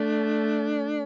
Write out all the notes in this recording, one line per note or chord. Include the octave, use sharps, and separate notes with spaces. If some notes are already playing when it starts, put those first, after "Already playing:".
Already playing: A3 D4